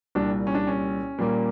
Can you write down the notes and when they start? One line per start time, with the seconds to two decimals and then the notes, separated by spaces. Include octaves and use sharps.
0.15 C2 A#2 G3 D4
0.47 C#4
0.55 D4
0.67 C#4
1.18 A#2 G3 A#3